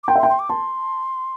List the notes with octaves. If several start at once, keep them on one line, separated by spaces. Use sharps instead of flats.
D6
G5 C6
E5
C6
G5
C6
D6
A5 C6